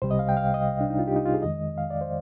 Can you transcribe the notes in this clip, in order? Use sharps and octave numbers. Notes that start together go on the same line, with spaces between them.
C2 C3 G3 C5
D#5
F5
G5
F5
D#5
D4
D#4
F4
G4
D#4
F4
G#4
F2 D#3 G#3 D#5
F5
D5
C5